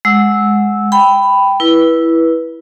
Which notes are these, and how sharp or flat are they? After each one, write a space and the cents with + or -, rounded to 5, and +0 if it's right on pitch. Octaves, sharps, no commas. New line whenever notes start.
G#3 +0 F#5 -10 E6 -10
G5 +0 B5 +10
E4 +0 B4 -20